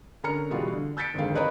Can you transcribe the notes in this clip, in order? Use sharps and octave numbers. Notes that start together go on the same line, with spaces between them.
D3 C#4 A#4 A#5 F6 C#7
B2 E3 G3 F4 F#4 G#4
D3
E6 G6 A6 B6 C#7 D7
G#1 F2 D3 D#3 G#4 F5
A#4 B4 C#5 D#5 A#5 B5